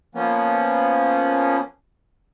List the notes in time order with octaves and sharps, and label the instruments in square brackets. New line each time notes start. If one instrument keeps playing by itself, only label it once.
[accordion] F3 A#3 B3 C#4